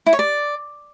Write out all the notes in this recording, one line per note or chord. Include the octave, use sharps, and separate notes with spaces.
E4
C#5
D5